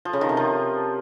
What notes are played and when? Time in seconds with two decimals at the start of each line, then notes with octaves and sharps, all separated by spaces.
0.05 F3
0.13 C#3
0.21 D#3
0.29 C3
0.37 F3